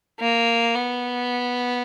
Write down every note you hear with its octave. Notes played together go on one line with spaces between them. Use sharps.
A#3
B3